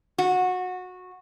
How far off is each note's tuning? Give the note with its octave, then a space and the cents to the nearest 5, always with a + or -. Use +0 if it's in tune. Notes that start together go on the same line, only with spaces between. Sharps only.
F#4 -20